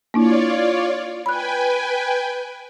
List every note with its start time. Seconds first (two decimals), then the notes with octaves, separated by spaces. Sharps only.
0.14 A#3 D4 E4 F4 C#5 D5
1.26 B4 G5 G#5 B5 F#6